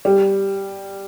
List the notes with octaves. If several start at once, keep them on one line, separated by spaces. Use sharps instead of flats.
G3